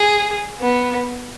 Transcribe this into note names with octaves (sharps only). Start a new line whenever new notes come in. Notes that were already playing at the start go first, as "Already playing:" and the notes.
Already playing: G#4
B3